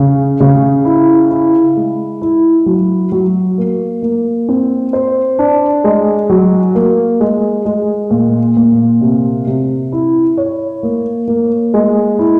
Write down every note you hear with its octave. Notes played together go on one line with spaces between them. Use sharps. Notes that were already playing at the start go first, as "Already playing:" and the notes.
Already playing: C#3
C#3
E4
E4
G#3
E4
F#3
F#3
A#3
A#3
C4
C5
D4
G#3
F#3
A#3
G#3
G#3
A#2
A#2
C3
C3
E4
C#5
A#3
A#3
G#3
E4